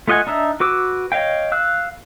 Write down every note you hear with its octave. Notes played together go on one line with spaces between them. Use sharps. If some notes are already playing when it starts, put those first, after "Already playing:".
A3 F4 D#5 F#5 G#5
D4 D#4 E5
F#4 B4 D6 E6
C#5 D#5 F5 G5
F5 E6 F#6